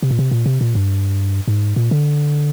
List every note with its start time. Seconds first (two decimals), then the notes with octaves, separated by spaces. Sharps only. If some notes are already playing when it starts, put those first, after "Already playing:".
0.03 C3
0.11 A#2
0.19 C3
0.31 A#2
0.46 C3
0.61 A#2
0.75 G2
1.48 G#2
1.76 A#2
1.91 D3